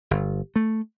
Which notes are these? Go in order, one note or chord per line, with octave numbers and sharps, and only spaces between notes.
G1
A3